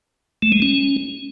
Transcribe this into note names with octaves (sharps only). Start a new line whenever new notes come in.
A3
G#3
C#4